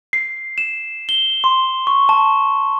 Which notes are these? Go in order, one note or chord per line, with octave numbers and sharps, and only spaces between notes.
C7
E7
G7
C6
C#6
A5